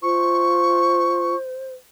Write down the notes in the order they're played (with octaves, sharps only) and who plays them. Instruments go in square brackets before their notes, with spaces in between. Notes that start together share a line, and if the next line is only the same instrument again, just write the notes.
[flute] F4 [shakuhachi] C5 [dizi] C#6